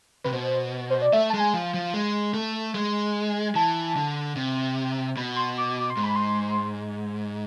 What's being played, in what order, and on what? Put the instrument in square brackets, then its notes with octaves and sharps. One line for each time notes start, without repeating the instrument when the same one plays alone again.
[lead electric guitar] C3 [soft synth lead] B4
[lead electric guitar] B2 [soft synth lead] C5
[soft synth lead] C5
D5
[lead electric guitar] A3 [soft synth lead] E5
[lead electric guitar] G#3 [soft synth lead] A5
[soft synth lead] G#5
[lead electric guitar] F3
F3
G#3
A3
G#3
[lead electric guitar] E3 [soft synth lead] A5
[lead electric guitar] D3
C3
[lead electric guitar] B2 [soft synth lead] B5
[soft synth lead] C6
D6
D6
C6
[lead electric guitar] G#2
[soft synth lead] B5
C6